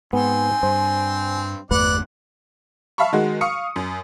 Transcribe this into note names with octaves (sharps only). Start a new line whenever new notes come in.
G#2 B3 C4 G#5
G2 C5
G1 E2 A3 B4 D5 F#5
E5 F5 A5 B5 C#6
D#3 G#3 F#4
F5 C#6 D#6 C#7
F#2